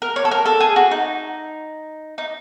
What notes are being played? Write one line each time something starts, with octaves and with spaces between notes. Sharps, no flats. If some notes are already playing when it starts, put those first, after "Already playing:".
A#4
C#5
A4
A#4
A4
G#4
F#4
D#4
D#4